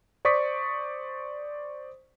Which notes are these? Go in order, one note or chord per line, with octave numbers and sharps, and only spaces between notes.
C5 D5 C#6 D#6 B6